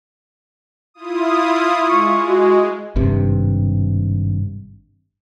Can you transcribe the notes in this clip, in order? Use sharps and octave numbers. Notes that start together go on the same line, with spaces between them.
E4 F4 D#6
G#3 C#6
F#4
G#1 G2 C3